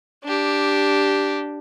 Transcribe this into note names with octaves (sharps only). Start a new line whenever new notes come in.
D4 G4